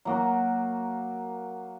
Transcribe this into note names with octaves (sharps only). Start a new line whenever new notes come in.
F#3 A#3 F#4